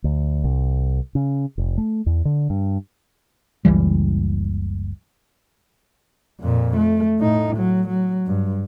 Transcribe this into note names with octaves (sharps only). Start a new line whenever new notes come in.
D2
C2
C#3
F1
A3
E2
D3
G2
F#1 C#2 E3 G3
F2 A#2
A3
A2 D#4
F#3
F#3
G2